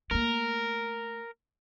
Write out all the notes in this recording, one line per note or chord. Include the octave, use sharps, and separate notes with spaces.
A3 A#3 A#4